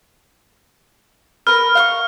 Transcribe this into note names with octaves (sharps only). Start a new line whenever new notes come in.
A#4 B4 F6
F5 F#5 C#6